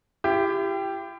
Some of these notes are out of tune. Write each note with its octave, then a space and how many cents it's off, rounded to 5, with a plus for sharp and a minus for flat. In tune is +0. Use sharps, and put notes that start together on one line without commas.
E4 +40 G4 +0